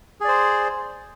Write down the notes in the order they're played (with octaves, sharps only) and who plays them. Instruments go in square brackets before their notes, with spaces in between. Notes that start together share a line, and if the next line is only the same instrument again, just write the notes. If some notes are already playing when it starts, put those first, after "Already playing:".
[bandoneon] G#4
D5
C5